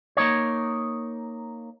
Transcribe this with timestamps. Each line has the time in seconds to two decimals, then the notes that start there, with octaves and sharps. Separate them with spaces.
0.17 A#3 D#4 C#5